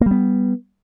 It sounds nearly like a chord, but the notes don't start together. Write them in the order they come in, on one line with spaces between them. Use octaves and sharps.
A#3 G3 B3